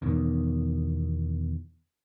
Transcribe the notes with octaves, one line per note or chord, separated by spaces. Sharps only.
E2 B2 D#3